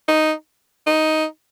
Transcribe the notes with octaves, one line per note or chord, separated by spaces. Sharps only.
D#4
D#4